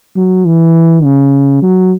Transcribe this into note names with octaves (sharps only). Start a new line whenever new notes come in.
F#3
E3
C#3
F#3